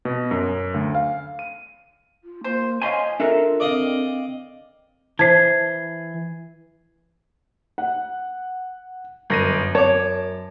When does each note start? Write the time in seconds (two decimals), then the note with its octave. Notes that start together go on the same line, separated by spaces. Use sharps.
0.05 B2
0.31 F#2
0.74 D2
0.95 F5
1.39 D#7
2.24 F4
2.44 A#3 C5
2.82 F3 C#4 D#5 F5 G#5 C6
3.20 D4 F4 A4 A#4 E5
3.60 C4 D5 D#5 F5
5.19 E3 C5 A5 G#6 C7
7.78 F#5
9.30 G1 F#2 A#6 D#7
9.75 C#5 A5 D6